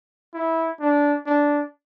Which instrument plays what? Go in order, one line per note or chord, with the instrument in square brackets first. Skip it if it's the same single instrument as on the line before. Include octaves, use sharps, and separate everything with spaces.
[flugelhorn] E4
D4
D4